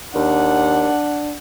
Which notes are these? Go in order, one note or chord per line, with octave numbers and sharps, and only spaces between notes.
D#2 D4 F#5